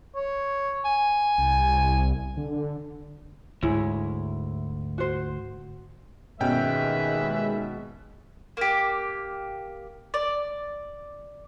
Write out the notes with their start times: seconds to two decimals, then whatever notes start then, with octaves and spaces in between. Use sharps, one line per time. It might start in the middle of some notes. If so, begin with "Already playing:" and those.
0.15 C#5
0.85 G#5
1.38 C2
2.37 D3
3.63 D2 G#2 E4 G#4 C#5
4.98 F#4 C5
6.40 D#2 B2 D#3 G#3 C#4 B4 E5 G5
8.57 A#3 G4
10.14 D5